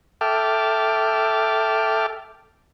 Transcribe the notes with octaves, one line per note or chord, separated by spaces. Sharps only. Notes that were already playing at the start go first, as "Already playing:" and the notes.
A4 E5 G5 A5 D6 F6